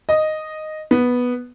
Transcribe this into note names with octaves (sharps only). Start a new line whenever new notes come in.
D#5
B3